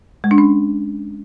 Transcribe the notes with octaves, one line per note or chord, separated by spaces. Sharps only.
G#3
D4
C#4